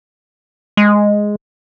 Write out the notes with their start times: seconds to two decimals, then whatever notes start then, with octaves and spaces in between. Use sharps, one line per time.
0.77 G#3